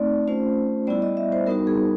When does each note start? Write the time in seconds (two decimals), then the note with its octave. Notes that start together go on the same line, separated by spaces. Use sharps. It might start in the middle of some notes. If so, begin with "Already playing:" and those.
Already playing: A3 C4 D#4 D5
0.28 A3 C#4 F4 C5
0.87 G3 B3 E4 D5
1.02 D#5
1.17 E5
1.32 C5
1.47 G3 B3 D#4 F#4 A#4
1.67 G#4